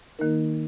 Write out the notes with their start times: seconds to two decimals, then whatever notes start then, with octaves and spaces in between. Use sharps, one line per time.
0.19 D#3 A#3 D#4 A#4